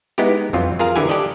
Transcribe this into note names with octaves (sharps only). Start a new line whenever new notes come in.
G#3 B3 D#4 E4 G4
F2 E3 F#3 C4 F4
F4 G#4 A#4 F5 A#5
D3 E3 E4 G4 F#5 G#5
G4 A4 D5 D#5